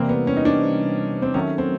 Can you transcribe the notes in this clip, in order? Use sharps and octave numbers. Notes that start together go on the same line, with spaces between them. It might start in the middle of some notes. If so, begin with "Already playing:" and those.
Already playing: C3 E3 G3 A#3 C4
B3
C#4
D#4
D4
C4
D#3 F#3 A3 C#4
C4